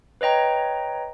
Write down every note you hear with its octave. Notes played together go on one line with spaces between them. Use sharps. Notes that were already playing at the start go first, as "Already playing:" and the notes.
B4 C#5 D#5 G5 A#5